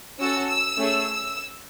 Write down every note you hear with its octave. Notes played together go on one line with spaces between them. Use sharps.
C#4 F#4 A4 E6
E6
A3 C#4 G#4